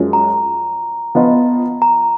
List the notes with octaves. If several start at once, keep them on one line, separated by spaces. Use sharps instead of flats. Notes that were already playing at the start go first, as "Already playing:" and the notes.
Already playing: F#2 F3 G#3
A#5
F3 B3 F4 B4 D#5
A#5